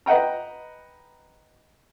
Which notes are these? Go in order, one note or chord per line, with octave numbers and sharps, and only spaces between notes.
B4 D#5 F#5 G5 A#5